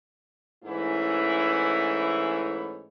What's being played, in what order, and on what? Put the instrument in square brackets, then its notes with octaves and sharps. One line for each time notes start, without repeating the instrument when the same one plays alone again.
[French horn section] G#2 E3 A3 C#4 E4